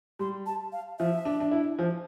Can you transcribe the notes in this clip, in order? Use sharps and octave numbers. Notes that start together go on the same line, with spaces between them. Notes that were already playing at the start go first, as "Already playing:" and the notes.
G3 C6
A5
F5
F3 E5
D4
D4
E4
F3